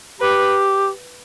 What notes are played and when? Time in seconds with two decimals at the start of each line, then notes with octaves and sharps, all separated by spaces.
0.20 G4 B4